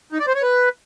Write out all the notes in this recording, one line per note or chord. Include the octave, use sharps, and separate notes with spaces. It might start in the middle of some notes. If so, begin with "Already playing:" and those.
D#4
D5
C5
C#5
B4